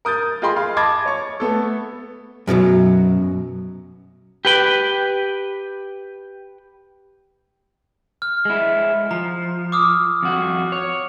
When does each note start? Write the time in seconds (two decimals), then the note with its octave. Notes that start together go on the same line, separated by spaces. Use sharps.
0.05 A#4 D#6 G6 A6
0.42 F4 G#4 D#5 G5 B5 C6
0.56 G#4 F5
0.77 D#5 A5 B5 D6 G#6 A6
1.06 C#5 C#6
1.40 A3 B3 A4
2.47 F#2 B2 D#3 F#3
4.45 G4 B4 G5
8.22 F6
8.45 G#3 E4
9.11 F3 A#5
9.72 D6 D#6 F6
10.23 F2 F#4
10.72 C#5